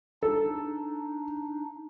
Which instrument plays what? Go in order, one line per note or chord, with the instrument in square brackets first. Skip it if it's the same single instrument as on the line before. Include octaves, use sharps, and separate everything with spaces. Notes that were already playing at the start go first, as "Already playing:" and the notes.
[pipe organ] D4 D#4 [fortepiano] A4